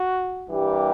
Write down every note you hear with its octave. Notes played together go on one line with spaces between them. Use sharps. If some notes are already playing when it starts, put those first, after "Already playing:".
Already playing: F#4
G2 E3 G3 A#3 G4